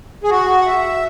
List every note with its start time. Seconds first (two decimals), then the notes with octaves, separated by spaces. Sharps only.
0.24 G#4
0.30 F#4
0.61 F#5
0.66 E5